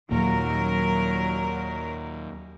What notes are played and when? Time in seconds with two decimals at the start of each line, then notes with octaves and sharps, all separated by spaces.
0.11 D#2 A#2 F#3 A#3 A#4